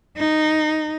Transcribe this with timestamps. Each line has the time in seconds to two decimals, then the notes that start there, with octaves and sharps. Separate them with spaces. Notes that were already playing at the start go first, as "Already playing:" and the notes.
0.18 D#4